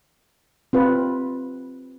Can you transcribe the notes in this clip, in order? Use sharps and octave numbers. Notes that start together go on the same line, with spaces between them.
C4 F4 B4